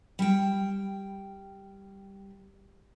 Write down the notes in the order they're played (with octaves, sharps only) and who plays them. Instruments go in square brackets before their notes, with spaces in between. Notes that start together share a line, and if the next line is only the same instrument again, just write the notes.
[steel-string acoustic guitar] G3 G5